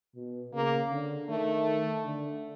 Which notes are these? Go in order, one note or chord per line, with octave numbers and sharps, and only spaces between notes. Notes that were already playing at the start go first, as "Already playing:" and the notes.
B2
C#3 A#3
D3
D#3 A3
D3